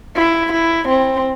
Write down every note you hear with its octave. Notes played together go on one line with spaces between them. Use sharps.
E4
E4
C4